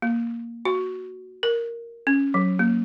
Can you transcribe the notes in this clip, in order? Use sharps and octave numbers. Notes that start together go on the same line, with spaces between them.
A#3
F#4
A#4
C#4
F#3
A#3